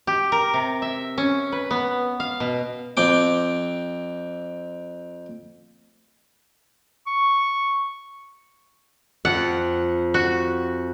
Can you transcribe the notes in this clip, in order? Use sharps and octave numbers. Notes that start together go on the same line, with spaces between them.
G4
A#4
C3
E5
C#4
B4
B3
F5
B2
F2 C4 G5 D6
C#6
F2 F#5
F#4